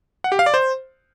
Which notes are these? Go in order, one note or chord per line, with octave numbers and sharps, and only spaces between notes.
F#5
G4
F5
D5
C5